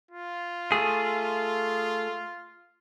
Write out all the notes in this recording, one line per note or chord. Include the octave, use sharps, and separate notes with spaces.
F4
A3 G#4